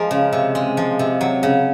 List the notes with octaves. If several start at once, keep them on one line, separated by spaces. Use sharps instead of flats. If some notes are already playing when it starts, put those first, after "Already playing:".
Already playing: F3 G#3 A#4
C#3
C3
G#3
F3
C3
F#3
C#3